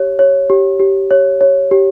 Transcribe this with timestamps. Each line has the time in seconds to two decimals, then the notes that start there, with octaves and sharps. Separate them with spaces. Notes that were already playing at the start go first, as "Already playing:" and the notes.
Already playing: G4 C#5
0.19 C#5
0.50 G4
0.80 G4
1.11 C#5
1.41 C#5
1.71 G4